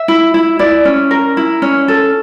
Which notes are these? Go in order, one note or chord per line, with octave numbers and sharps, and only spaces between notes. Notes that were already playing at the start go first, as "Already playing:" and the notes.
Already playing: E5
E4
E4
E4 D5
C#4
A#4
E4
C#4
A4